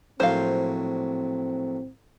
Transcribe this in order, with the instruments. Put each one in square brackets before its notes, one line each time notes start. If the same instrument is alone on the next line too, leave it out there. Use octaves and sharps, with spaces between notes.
[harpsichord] A#1 A2 F#3 [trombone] C4 [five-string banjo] C5 F5